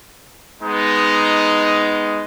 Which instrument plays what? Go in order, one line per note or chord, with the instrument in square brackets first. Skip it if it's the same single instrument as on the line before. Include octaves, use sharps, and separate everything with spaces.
[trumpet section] G#3 B3 D#4